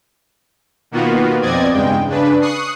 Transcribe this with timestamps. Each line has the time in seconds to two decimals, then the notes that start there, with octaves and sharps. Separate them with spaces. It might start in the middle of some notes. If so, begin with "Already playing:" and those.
0.91 B2 D#3 A#3 B3 F4 F#4
1.42 F2 B2 C4 D5 D#5 G#6
1.73 E2 G2 C#3 G#3 G5
2.07 C#3 D4 B4
2.41 C#6 D#6 F#6 C7